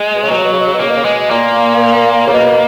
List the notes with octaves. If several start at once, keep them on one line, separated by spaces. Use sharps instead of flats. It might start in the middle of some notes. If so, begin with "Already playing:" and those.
Already playing: G#3
B2
C#3
B2 F#3
C#3
B2
C#3
B2
C#3
B2
C#3 A#3
B2
C#3
B2 G#3
A#2 A#3
C#3
B2